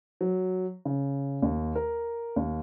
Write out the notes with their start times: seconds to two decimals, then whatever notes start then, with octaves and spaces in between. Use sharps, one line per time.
0.21 F#3
0.85 C#3
1.42 D#2
1.75 A#4
2.36 D#2